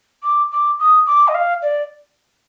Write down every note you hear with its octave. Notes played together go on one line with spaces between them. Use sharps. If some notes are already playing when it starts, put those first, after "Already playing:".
D6
D6
D#6
D6
D#5
F5
D5